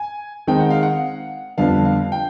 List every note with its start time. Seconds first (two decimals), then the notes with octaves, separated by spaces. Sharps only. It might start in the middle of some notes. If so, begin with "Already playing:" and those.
Already playing: G#5
0.47 D#3 G#3 C4 D#4 G5
0.60 F#5
0.70 F5
0.83 F#5
1.58 F2 D3 G3 B3 D4 F5
1.85 F5
2.12 G5